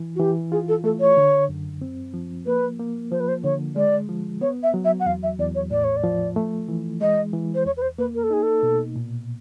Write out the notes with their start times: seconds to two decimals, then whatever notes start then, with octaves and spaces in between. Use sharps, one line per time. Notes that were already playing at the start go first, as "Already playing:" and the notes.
Already playing: E3
0.15 F#4
0.19 E3 G4
0.52 F4 G#4
0.68 A4
0.84 A3 A4
1.00 C#5
1.17 D3
1.49 F#2
1.82 C4
2.14 F3
2.46 A#3 B4
2.79 A#3
3.11 F3 C5
3.20 B4
3.28 C5
3.44 D3 C#5
3.76 G#3 D5
4.09 F3
4.41 B3 C#5
4.63 E5
4.74 F#3
4.85 E5
5.00 F#5
5.06 E2 F5
5.23 E5
5.39 E2 D5
5.55 C#5
5.71 A2 D5
5.84 C#5
5.96 D5
6.03 F3
6.36 A3
6.68 E3
7.01 G#3 D#5
7.33 E3
7.55 C5
7.66 E2 C#5
7.77 B4
7.82 C5
7.98 A#3 B4
8.15 A#4
8.23 A4
8.31 D#4 G#4
8.43 A4
8.63 B2
8.96 A#2